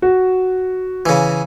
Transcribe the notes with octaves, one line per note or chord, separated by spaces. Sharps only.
F#4
C#3 E3